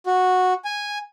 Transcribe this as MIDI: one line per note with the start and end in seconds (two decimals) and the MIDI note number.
0.06 0.53 66
0.65 0.98 80